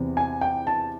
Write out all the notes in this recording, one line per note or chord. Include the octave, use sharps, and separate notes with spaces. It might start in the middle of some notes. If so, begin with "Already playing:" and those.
Already playing: E2 C3 E3
G#5
G5
A5